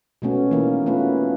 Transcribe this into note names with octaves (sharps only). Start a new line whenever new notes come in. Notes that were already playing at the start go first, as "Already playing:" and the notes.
B2 G#3 A3 B3 C#4 F#4
E3 A#3 D#4
A3 B3 C#4 D4 F4 B4